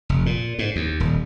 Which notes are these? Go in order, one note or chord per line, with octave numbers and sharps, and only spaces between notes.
F1
A#2
G#2
D#2
D#1